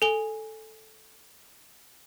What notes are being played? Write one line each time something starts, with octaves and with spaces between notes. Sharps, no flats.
A4 G#5 G7